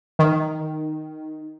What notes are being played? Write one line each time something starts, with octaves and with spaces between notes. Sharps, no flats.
D#3